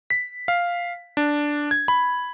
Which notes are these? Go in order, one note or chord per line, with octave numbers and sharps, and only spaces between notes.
B6
F5
D4
G#6
B5